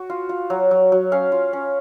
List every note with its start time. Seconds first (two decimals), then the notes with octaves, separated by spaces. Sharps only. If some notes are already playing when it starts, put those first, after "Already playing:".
Already playing: F#4
0.10 F4
0.29 F4
0.50 F#3
0.71 F#3
0.92 F#3
1.12 C#4 F5
1.32 F4
1.53 C#4